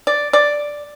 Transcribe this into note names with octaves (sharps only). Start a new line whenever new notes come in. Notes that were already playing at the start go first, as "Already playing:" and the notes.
D5
D5